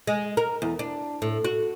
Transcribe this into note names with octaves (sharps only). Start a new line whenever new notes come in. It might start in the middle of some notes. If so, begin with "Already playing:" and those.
G#3
A#4
E2
D4
A2
F#4